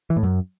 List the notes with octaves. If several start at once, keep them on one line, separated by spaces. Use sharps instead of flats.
E3
A2
F#2